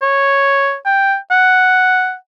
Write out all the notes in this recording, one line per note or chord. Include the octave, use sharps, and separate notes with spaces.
C#5
G5
F#5